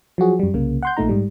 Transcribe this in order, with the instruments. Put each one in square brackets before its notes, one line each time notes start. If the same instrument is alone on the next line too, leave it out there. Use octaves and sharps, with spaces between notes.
[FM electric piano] F3 F#3 F#4 G#4
F#2 G3
C2 C#3 A#3
F#5 C6 G6
A#1 A#2 A3 D#4 A#5
G#2 G3